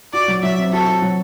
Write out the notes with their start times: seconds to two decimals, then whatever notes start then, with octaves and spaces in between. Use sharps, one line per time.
0.13 F#4 D5
0.28 F#3
0.43 F#3 E5
0.58 C4
0.72 F#4 A4
0.87 F#4
1.02 F#3